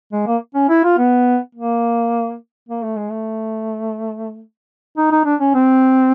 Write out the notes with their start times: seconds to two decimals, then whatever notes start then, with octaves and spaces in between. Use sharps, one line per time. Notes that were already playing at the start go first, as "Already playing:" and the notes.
0.13 G#3
0.27 A#3
0.55 C#4
0.69 E4
0.84 F4
0.98 B3
1.55 A#3
2.69 A#3
2.83 A3
2.96 G#3
3.11 A3
4.97 D#4
5.11 D#4
5.25 D4
5.40 C#4
5.54 C4